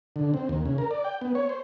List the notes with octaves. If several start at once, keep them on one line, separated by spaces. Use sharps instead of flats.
D3
C4
D#2
C#3
A#4
D5
G5
B3
C#5
C5